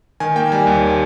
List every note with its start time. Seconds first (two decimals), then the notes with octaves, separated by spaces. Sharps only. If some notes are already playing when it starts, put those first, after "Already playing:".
0.20 D#3 G#5
0.36 A#3 G5
0.52 G3 G#5
0.67 D#2